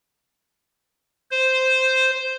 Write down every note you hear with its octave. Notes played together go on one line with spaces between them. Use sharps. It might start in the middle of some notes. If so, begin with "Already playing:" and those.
C5